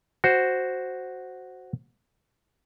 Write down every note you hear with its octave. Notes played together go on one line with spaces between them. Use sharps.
F#4 C5